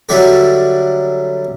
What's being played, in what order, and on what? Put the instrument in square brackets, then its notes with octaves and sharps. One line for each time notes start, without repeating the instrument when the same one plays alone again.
[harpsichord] D3 F#3 G3 E4 G4 A4